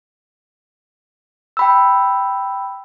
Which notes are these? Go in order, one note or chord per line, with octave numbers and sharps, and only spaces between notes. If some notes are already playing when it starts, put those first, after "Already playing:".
G5 B5 E6